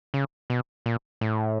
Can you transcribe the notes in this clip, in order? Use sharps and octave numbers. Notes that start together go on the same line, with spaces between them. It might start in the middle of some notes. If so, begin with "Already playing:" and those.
C#3
B2
A#2
A2